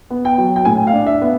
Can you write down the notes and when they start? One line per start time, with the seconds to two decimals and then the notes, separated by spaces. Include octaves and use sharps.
0.10 B3
0.25 G5
0.38 F#3
0.56 G5
0.65 A2 G#5
0.87 F5
0.93 D4
1.07 E5
1.22 B3